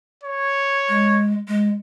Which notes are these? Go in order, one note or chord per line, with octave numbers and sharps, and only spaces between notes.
C#5
G#3
G#3